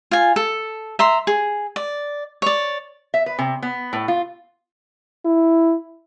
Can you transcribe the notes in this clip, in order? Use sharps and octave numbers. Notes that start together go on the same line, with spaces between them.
F4 G#5
A4
E5 A#5 C6
G#4
D5
C#5 D5
E5
B4
C3
B3
A2
F4
E4